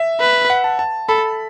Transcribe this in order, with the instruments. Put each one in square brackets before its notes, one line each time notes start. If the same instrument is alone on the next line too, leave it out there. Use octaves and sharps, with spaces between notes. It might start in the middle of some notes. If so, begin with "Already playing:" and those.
Already playing: [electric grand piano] E5
[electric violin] B4
[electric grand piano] F#5
A5
A5
[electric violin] A4 [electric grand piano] B5